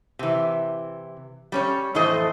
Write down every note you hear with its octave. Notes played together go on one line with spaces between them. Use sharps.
C3 E3
G3 C#4 C#5
F2 A2 E3 A4 C5 D#5